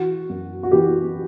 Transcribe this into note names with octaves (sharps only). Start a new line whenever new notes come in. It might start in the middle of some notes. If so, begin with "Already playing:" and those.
Already playing: E3 F#4
F#2
F#4
E3 G4